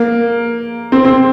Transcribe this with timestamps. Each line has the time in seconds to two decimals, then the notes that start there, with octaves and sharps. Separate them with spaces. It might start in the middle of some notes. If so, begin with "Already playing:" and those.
Already playing: A#3
0.92 C4
1.05 C4